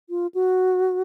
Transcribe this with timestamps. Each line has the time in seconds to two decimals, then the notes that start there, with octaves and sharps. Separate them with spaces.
0.10 F4
0.34 F#4